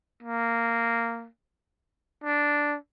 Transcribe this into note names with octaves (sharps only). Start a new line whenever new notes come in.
A#3
D4